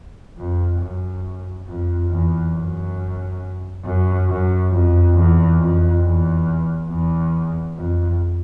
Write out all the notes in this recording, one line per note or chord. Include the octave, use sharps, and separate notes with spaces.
F2
F#2
F2
E2
F#2
F#2
F#2
F2
E2
F2
E2
E2
F2